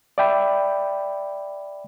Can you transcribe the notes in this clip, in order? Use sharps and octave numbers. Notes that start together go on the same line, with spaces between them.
D5 E5 G5 B5